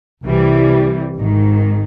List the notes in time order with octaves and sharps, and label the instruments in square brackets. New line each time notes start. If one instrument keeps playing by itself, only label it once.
[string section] C2 C3 E3 G3
G#1 G#2 D#3